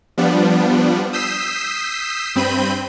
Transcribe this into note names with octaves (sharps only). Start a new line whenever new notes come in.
F3 G3 B3 D4
D#6 E6 G6 B6 C7 E7
G2 C4 B5 G6 D#7